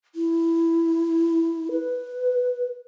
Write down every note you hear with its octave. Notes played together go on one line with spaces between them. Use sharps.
E4
B4